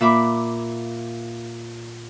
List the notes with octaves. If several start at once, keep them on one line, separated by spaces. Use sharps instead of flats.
A#2 E5 B5 D6